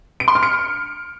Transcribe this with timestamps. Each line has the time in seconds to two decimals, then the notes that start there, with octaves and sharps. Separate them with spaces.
0.20 D7
0.28 C6
0.35 F6
0.43 C#7